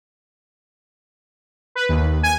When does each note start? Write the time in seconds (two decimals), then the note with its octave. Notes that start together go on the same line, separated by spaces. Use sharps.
1.75 B4
1.89 D#2
2.23 G#5